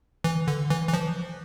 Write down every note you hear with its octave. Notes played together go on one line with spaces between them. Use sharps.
E3
D3
E3
E3
F3